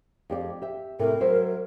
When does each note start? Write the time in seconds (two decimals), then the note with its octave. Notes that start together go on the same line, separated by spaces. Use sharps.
0.30 F2 G4 D5
0.62 G4 E5
0.99 A2 C3 A3 A#4
1.21 F#3 C5 E5